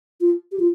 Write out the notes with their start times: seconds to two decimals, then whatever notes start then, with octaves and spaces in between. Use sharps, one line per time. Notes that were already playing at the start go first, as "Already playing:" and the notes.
0.21 F4
0.52 G4
0.60 F4